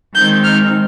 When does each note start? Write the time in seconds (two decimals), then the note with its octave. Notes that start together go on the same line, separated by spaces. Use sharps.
0.15 D#3 G#3 C4 D#4 G6
0.44 F6